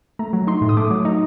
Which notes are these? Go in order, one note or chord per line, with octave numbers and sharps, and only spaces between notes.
A3 A#5
F#3
D#4 C6
A2
D#6
A3 D6
F#3
D#4